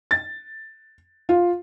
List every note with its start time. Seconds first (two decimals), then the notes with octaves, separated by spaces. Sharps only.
0.11 A6
1.29 F4